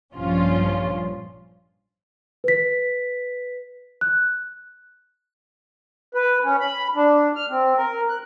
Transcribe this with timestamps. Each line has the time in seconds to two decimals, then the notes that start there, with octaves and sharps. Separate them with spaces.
0.14 A#1 G2 F3 C#4 F4
2.44 B4 B6
4.01 F#6
6.14 B4
6.44 C#4
6.60 B5
6.96 D4
7.35 F6
7.50 C4
7.77 A#4
8.09 F#6